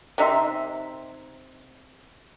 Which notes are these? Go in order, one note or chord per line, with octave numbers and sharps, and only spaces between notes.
C3 D#4 E5 C6